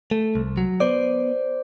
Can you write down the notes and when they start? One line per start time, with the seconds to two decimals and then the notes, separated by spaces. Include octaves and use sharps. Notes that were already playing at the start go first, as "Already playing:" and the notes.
0.11 A3
0.35 C2
0.57 F#3
0.80 B3 C5 D5